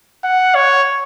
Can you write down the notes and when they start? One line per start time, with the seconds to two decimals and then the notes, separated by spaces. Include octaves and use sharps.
0.24 F#5
0.55 C#5